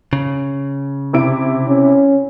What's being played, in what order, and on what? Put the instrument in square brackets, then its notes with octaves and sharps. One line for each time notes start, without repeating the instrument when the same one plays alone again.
[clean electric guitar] C#3
[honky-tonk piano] C3 E4 D7
[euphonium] C#4